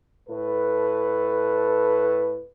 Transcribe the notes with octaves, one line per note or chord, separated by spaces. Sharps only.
A2 A4 B4